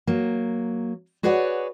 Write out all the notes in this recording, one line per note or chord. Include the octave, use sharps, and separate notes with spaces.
F#3 A#3
F#4 G#4 B4 C#5 D5 F#5